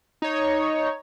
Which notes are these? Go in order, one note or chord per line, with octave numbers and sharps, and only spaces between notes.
D#4 C#5